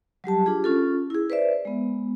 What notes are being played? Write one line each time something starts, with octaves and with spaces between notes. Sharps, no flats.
F#3 G3 G4 A5
D4 F4 G4 G#4
C#4 F4 A4
E4 G#4
B4 C5 D5 E5
G#3 B3